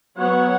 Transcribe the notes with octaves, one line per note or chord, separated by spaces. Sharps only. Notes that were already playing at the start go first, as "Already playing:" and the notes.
F#3 B3 C#5 F#5